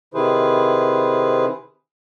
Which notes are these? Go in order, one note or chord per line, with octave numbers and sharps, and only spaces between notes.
C3 D#3 E4 G#4 B4 C5